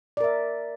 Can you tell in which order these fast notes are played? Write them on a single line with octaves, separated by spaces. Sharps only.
D5 A#4 E5